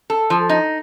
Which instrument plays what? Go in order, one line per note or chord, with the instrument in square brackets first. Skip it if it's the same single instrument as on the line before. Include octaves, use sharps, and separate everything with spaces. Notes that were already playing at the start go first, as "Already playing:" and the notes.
[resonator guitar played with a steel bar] A4
F3
D#4